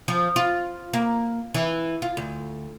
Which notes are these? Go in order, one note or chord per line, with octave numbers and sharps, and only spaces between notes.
F3
F4
A#3
E3
F4
D2